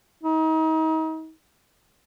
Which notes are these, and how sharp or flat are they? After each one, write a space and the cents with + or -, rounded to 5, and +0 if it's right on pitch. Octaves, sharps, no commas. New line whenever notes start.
D#4 +35